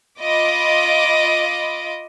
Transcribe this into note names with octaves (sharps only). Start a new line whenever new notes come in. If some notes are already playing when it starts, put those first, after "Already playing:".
F4 D#5 B5 D6